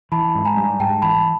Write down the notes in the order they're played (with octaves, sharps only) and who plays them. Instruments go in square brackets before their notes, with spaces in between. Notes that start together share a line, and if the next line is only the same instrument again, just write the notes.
[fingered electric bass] E3 [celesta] A5 B5
[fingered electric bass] G#2
[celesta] G#5 A#5
[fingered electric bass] G3
[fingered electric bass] G#2 [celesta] G5 A5
[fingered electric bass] E3 [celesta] A5 B5